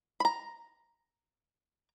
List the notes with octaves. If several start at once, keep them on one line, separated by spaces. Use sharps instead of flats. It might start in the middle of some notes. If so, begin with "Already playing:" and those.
A#5 B5